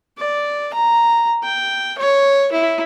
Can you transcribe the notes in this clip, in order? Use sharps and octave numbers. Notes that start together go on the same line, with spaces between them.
D5
A#5
G5
C#5
E4